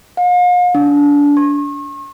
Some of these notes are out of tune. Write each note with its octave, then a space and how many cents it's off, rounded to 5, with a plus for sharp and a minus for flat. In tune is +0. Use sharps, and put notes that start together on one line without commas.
F5 +40
D4 -25
C#6 -40